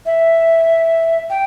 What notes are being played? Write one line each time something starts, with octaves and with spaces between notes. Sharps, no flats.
E5
G5